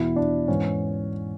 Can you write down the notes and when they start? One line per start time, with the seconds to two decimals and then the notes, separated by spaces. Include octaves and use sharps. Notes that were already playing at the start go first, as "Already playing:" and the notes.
Already playing: E2 B2 E4
0.16 D4
0.48 G#2 E3 C#4